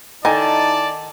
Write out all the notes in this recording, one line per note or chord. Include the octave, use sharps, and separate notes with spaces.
D#3 D#4 E4 A4 D5 G#5 A5